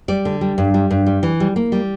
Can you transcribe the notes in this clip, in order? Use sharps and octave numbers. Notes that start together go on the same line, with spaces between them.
G3 D5
D3
G3
G2
G3
G2
G3
E3
G3
A#3
G3